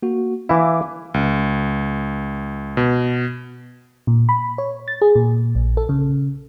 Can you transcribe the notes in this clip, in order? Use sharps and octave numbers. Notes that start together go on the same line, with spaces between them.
A#3 F#4
E3 E4 F5 G#5 D6
C#2
B2
A#2
B5
C#5
A6
G#4
A#2
A#1
A4
C#3